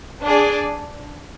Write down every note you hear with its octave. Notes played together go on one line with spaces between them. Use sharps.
D4 G#4 D5